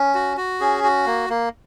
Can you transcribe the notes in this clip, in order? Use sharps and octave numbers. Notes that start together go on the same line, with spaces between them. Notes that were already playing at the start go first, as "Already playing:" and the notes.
Already playing: C#4
F#4
F#4
C#4 G#4
F#4
A#3
A#3